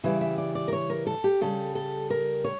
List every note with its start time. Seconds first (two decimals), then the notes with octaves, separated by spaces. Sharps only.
0.03 C#3 E3 G3 E5
0.21 E5
0.38 D5
0.55 D5
0.68 A#4
0.73 C#5
0.90 A#4
1.07 A4
1.24 G4
1.41 C#3 G3 A4
1.75 A4
2.10 A#4
2.44 C#5